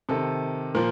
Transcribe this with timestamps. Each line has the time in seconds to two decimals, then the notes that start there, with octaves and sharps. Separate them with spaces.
0.09 C3 D#3 A4
0.75 A#2 F3 A#4